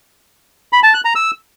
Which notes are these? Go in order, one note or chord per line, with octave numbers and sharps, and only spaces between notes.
B5
A5
F#6
A#5
E6